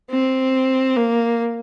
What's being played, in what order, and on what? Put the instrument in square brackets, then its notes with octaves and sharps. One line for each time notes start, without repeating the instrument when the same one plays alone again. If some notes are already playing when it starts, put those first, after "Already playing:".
[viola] C4
A#3